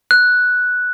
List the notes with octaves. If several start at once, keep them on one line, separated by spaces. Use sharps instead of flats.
F#6